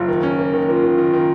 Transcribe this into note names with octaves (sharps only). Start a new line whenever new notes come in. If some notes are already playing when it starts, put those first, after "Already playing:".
Already playing: F#1 F4
D#3
C#4
A#3
D#3
A#3 F4
D#3
D#3
D#3